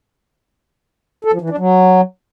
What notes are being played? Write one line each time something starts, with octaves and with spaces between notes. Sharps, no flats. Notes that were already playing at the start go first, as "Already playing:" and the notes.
A4
F3
E3
D4
F#3